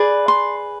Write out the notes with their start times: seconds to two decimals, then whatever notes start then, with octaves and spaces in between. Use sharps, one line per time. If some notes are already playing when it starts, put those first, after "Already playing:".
Already playing: G#4 B4 D5
0.28 C6